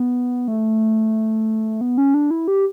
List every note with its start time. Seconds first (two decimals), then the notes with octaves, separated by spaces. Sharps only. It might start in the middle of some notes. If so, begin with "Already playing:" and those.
Already playing: B3
0.48 A3
1.81 B3
1.98 C#4
2.14 D4
2.31 E4
2.48 G4